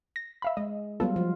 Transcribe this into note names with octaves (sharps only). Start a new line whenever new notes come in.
A#6
E5 F5 B5
G#3 D#5
F#3 G3 B3 F4 A4
F3